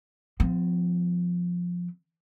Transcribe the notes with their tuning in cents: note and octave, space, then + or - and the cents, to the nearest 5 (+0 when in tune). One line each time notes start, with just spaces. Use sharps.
F3 +15 C4 -45